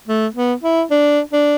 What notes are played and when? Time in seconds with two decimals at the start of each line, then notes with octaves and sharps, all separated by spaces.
0.07 A3
0.35 B3
0.63 E4
0.91 D4
1.33 D4